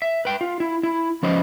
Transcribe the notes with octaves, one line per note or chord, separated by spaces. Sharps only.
E5
B4 G5
F4
E4
E4
F3 C#4 B4 C5 D#5